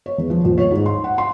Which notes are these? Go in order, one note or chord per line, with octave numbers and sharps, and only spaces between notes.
C#5
E2
F3
D#1
C#5
G#2
C6
F#5
C6